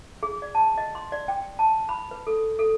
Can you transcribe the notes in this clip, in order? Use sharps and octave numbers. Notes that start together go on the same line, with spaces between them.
G#4
D5
A5
D#5
C6
D5
G5
A5
B5
B4
A4
A4